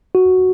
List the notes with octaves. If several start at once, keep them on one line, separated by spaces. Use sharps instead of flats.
F#4